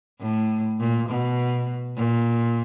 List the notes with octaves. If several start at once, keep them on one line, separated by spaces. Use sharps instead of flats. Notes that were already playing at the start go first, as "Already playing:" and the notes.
A2
A#2
B2
A#2